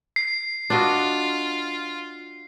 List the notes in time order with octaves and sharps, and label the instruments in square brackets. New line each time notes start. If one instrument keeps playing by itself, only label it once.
[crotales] C7
[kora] D4 F#4 D#5 [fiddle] F4